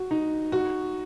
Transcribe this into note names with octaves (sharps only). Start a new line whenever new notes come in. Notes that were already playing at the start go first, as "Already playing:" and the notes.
Already playing: F#4
D#4
F#4